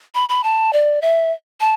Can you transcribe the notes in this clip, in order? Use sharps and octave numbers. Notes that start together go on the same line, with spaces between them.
B5
B5
A5
D5
E5
A5